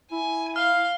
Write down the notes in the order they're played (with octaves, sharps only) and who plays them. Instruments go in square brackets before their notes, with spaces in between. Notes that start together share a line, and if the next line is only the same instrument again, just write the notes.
[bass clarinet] E4 [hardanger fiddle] G#5
[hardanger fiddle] F5 [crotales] F6